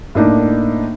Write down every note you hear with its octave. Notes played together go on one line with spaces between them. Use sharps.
A2 A#3 D4 D#4